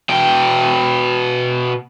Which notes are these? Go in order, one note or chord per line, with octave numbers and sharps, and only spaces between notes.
B2 G5